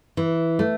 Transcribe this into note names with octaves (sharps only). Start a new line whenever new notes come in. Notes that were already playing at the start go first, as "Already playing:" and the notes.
E3
A3